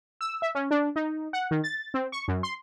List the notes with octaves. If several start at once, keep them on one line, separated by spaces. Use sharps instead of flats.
E6
E5
C#4
D4
D#4
F#5
D#3
A6
C4
C#6
F#2
C6